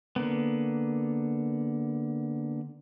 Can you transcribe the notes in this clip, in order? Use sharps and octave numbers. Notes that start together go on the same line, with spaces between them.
D3 A#3 B3